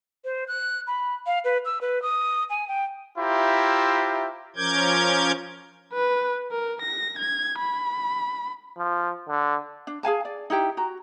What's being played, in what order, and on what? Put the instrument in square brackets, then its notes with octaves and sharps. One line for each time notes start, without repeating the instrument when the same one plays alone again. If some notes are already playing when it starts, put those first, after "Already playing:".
[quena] C5
F#6
B5
F5
B4
E6
B4
D#6
G#5
G5
[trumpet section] E4 F4 G4 C5 E5 A#5
[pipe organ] F3 C#4 A#4 D6 G6 G#6
[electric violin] B4
A#4
A#6
G#6
B5
[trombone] F3
D3
[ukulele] D4
G#4 F5 G#5 A5
D5
D#4 E4 G4 G5
F#4 A#5